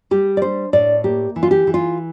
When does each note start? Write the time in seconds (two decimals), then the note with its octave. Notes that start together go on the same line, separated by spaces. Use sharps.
0.11 G3 G4
0.37 D5
0.41 D4 C5
0.73 A2 D5
1.04 A#3 G4
1.36 E3
1.43 F4
1.51 G4
1.67 E3
1.74 F4